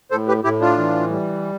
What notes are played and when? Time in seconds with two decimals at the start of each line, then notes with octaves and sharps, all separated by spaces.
0.11 A2 A4 C5
0.28 G4 B4
0.44 A2 E4 G4
0.61 D4 F4
0.78 E3
1.10 G3